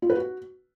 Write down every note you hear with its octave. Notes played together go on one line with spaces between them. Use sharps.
F4
B4
F#4